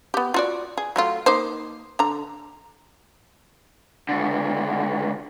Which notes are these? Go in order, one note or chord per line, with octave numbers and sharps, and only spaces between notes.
B3 G4
F4 F#4 D5
G#4
F#3 A3 F4
A#3 D#4 C5
D3 A#5
C#2 D3